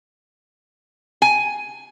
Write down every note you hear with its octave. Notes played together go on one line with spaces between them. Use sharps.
G#5